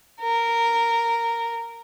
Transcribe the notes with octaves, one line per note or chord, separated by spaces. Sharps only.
A#4